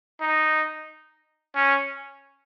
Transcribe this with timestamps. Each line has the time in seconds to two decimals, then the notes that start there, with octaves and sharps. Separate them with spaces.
0.21 D#4
1.56 C#4